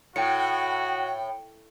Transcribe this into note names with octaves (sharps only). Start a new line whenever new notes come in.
A2 F#4 G5 C#7